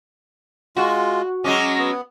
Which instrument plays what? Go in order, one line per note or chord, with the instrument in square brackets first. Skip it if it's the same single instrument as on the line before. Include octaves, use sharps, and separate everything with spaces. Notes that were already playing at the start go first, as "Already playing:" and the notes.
[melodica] G#3 F4 [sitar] F#4
[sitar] F#3 G#3 C#4 [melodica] D#5 D6
[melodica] B3